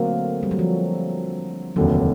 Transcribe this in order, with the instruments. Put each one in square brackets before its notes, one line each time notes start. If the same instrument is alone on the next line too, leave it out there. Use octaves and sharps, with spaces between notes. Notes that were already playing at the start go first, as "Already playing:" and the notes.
Already playing: [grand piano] D3 F#3 A3 C4 [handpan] A#3
[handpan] G3
F#3
F3
[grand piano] F1 D#2 D3 [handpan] F#3